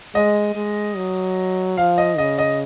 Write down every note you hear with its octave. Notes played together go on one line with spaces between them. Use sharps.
G#3 D#5
G#3
F#3
F3 F5
D#5
C#3 D#5
D#5